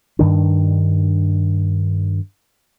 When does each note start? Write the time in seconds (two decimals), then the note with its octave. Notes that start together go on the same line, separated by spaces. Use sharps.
0.19 G2 D#3 D4